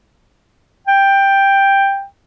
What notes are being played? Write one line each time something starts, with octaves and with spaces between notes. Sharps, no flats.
G5